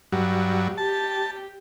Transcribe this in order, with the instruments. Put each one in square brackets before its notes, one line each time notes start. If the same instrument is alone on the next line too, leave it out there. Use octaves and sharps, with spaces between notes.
[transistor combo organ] G2 F#3
[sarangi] G4 [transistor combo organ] A5